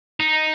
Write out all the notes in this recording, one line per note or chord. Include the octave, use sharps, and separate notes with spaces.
D#4